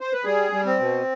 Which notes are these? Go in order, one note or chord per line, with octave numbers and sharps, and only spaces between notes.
C5
B4
G3 G#4
G3
C4
B2